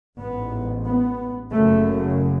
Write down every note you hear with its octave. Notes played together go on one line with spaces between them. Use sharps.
A1 G#2 B3
B3
F#1 F#2 C#3 A3